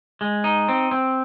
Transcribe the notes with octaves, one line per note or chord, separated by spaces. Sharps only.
G#3
D#4
C4
C4